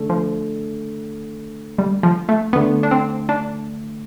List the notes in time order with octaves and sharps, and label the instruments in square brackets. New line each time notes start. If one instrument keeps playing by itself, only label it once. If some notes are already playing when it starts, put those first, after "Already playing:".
Already playing: [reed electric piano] D3 A3 D4 A4
[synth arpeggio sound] F3
G3
F3
A3
[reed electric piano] D2 D3 A3 [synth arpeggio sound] B3
[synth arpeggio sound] D4
C4
D4